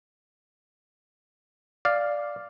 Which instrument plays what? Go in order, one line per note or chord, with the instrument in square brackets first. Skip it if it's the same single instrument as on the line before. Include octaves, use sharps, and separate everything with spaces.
[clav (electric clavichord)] D5 F5